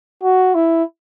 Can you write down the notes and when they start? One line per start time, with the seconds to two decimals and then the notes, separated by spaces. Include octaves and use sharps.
0.23 F#4
0.55 E4